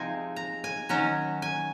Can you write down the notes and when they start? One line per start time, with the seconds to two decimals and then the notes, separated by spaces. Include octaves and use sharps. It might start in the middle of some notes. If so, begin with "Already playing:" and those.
Already playing: C3 F3 G#3 C4 D#4 G#5
0.36 A#5
0.64 G#5
0.89 D#3 F#3 C#4 A#5
1.42 G#5